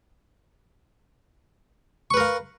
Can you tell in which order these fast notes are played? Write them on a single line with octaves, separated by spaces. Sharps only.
C#6 B4 A#4 F5